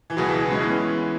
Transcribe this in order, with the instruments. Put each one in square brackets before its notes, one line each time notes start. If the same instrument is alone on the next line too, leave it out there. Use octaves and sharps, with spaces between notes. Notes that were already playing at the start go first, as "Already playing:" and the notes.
[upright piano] E3
[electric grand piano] C#2 B2 B3 E4 G#4 [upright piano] F#3
[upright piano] E3
G#3 C#4
[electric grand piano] E3 B3 E4